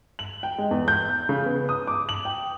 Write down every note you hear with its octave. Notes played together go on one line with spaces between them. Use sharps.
F#7
G5
G#3
E2
G6
C#3
B3
D#6
D6
F#7
G5